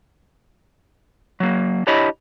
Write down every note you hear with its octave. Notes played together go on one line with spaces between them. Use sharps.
F#3 A#3
D4 E4 G4 C#5 D#5 B5